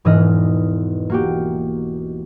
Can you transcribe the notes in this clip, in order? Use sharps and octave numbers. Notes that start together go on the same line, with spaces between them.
E1 G#2 E3 B4 D#5 F6
A#3 F#4 G4